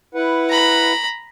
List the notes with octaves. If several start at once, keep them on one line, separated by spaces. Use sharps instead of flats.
E4 B4 F#5
A#5 B5